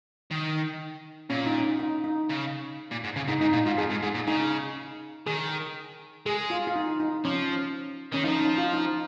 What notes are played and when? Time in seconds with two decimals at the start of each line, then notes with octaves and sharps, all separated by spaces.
0.31 D#3
1.30 A#2 C#4
1.46 D#4
1.64 D#4
1.79 D#4
2.04 D#4
2.29 C#3
2.91 A#2
3.04 G#2
3.16 C#3
3.28 G#2 D#4
3.41 G#2 D#4
3.53 A#2 D#4
3.66 G#2 F4
3.78 F2 G#4
3.90 G#2
4.02 G#2 G#4
4.15 A#2
4.27 C#3 D#4
5.26 D#3 G#4
6.26 G#3 G#4
6.50 F4
6.67 F4
6.76 D#4
7.00 D#4
7.25 F3 C#4
8.12 D#3 C#4
8.24 F3 D#4
8.41 D#4
8.58 F4
8.73 D#4